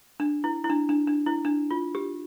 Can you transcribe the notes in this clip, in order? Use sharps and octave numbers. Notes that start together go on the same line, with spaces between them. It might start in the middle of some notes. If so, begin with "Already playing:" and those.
D4
E4
E4
D4
D4
D4
E4
D4
F4
G4